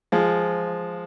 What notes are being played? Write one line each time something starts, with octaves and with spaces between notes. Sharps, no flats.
F3 G#3